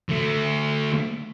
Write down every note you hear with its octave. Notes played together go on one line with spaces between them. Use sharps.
D3 A3